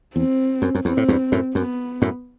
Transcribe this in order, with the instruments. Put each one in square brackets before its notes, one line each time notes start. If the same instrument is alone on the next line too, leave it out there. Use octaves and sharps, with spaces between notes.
[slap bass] E2 [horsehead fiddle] C4
[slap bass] F#2
F#2
[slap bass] E2 [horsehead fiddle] C4
[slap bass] A2
E2 G2
F#2 A2
[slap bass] F#2 [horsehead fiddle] B3
[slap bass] F#2 A2